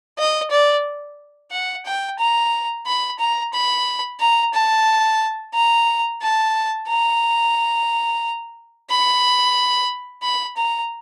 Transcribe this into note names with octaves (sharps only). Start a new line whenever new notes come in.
D#5
D5
F#5
G5
A#5
B5
A#5
B5
A#5
A5
A#5
A5
A#5
B5
B5
A#5